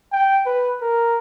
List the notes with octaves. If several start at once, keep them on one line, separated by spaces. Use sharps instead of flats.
G5
B4
A#4